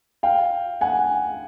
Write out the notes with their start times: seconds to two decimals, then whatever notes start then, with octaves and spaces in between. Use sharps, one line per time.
0.23 F5 G5
0.81 F#5 G#5